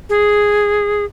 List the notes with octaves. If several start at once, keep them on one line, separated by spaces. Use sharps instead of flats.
G#4